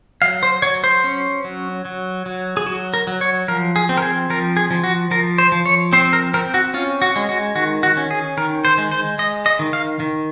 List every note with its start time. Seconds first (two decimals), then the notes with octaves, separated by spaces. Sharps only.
0.22 F#3 F5
0.43 C5
0.62 F#3 C#5
0.84 C5
1.04 C#4
1.44 F#3
1.85 F#3
2.26 F#3
2.57 G#4
2.66 F#3 F#4
2.94 A#4
3.07 F#3
3.21 C#5
3.48 F3 A#4
3.76 G#4
3.89 C4
3.97 A#4
4.02 G#4
4.30 F3 A#4
4.57 G#4
4.71 F3
4.84 F#4
5.11 F3 A#4
5.38 C5
5.52 F3
5.66 C#5
5.93 C4 C5
6.13 A#4
6.34 C4 A#4
6.54 F#4
6.74 C#4 F4
7.02 F#4
7.16 G#3
7.29 F#4
7.55 D#3 F#4
7.83 F#4
7.97 C#4
8.11 G#4
8.37 D#3 A#4
8.65 C5
8.78 G#3
8.91 C5
9.18 G#3 D#5
9.46 D#5
9.59 D#3
9.73 F5
10.00 D#3